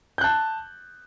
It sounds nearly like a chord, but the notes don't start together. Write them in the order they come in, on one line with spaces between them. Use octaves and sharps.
G6 F#6 A5